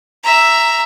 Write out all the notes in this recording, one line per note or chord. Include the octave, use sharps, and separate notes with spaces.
E5 A#5